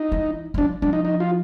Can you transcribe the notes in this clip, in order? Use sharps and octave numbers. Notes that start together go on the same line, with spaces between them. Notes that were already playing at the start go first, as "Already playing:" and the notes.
Already playing: D#4
E3
F#3
F3 D4
F3 D4
D#4
D#4
F4